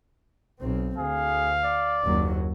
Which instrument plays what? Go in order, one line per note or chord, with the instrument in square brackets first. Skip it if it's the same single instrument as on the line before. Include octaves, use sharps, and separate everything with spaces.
[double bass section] B1 C4
[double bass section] D2 [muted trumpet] G#4 [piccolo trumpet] F5
[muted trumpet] D5
[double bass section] F#1 D#2 F#3